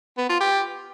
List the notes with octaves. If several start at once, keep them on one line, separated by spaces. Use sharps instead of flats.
B3
F4
G4